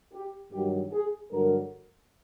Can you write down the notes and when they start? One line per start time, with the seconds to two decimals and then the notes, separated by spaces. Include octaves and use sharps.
0.14 G4
0.52 G2 D#3 F#3 G4
0.92 G#4
1.31 G2 D3 F#3 A#4